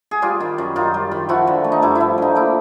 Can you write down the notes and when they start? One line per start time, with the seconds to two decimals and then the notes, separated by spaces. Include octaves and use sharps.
0.11 G#4
0.22 G3 F4 G4
0.40 D#3
0.58 F#2
0.76 F#2 D#4 F4
0.94 G3
1.11 D#3
1.29 F3 E4 F#4
1.47 D3
1.64 A3
1.72 D#4
1.82 G2 E4
1.95 E4
2.00 F3
2.18 D3 D#4
2.35 A#3 E4